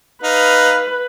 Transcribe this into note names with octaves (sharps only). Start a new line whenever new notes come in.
D#4 B4 F5